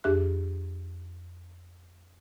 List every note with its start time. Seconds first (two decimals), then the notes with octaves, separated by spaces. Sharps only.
0.04 F2 D4 G4 G#4 E5 F#6